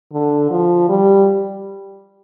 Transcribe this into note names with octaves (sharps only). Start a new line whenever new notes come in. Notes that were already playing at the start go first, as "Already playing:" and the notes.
D3
F3
G3